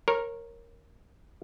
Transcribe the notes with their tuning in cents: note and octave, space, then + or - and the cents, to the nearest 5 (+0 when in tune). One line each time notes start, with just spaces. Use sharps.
A#4 +0 C#5 -20 A#5 +0